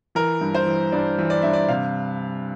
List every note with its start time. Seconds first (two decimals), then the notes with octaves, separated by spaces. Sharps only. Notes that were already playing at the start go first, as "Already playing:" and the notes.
0.15 E3 A#4
0.41 G2
0.54 C5
0.66 E3
0.92 G2 D5
1.18 E3
1.30 D5
1.42 G2 E5
1.53 D5
1.68 C3 F5